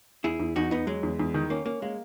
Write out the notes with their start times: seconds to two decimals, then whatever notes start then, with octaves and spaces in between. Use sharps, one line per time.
0.24 E2 E4 G#4
0.40 E2
0.56 E2 D#4 F#4
0.71 E2 B3 D#4
0.87 F#3 G#3
1.03 E2
1.19 E2
1.34 D#3
1.50 A#3 C#4
1.66 A#3 C#4
1.82 G#3 A#3